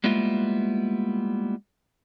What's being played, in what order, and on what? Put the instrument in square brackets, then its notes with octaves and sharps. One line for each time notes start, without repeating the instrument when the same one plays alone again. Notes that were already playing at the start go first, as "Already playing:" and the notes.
[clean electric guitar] G3 G#3 A#3 B3 E4 F4